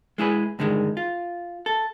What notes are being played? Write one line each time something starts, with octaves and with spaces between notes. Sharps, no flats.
G#3 E4 G#4 B4
G2 D3 D#3 G#3
F4
A4